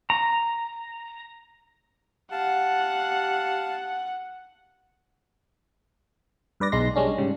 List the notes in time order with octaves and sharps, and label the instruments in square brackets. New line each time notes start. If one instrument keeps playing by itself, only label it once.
[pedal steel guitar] A#5
[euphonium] G4 [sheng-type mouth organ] F5 A5 [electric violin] F#5
[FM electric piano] G2 B4 D5 A#6
B1 G#3 D#4 C6 A#6
G3 G#3 C#4 D4
G#2 C#3 G3